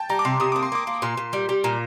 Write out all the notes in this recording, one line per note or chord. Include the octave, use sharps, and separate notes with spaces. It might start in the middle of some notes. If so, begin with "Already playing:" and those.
Already playing: G5 A5
G3 A#5
D6
C3 C6
C3 D#6
A#3 D6
C6
A#3 D6
A#3
A#2 C6
A#2
G3
G3
A#2 A#5